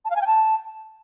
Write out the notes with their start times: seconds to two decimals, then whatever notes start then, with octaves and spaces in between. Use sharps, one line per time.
0.05 A5
0.10 F5
0.16 G#5
0.21 G5
0.27 A5